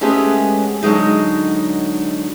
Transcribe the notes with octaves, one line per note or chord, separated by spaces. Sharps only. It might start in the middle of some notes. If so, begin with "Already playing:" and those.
G#3 A3 B3 C#4 G4 G#4
D3 F#3 G#3 D#4